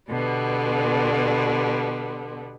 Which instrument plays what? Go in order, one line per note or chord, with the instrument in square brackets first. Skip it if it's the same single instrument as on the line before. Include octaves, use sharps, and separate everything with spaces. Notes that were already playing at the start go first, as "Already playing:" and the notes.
[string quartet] B2 D3 G3 B3